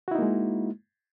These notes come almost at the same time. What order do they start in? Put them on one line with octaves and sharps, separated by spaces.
F#4 E4 D#4 A#3 G#3